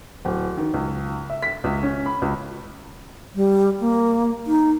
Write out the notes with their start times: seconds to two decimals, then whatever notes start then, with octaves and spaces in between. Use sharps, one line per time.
0.25 D1
0.57 D#3
0.74 C#2
1.30 E5
1.43 B6
1.64 C#2
1.83 C#4
2.06 B5
2.22 C#2
3.35 G3
3.80 A#3
4.47 D#4